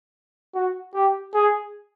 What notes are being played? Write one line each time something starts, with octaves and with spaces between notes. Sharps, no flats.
F#4
G4
G#4